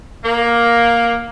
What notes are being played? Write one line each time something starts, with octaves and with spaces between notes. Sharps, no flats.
A#3